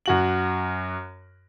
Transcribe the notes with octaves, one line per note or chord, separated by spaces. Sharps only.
F#2 F#4 F#7